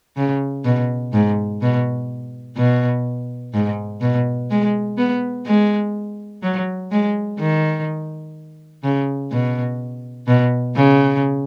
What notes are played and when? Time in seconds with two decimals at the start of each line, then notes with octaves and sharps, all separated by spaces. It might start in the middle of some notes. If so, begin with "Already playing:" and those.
0.17 C#3
0.65 B2
1.13 G#2
1.62 B2
2.57 B2
3.54 G#2
4.01 B2
4.50 G#3
4.98 B3
5.46 G#3
6.42 F#3
6.91 G#3
7.39 D#3
8.83 C#3
9.31 B2
10.27 B2
10.75 C#3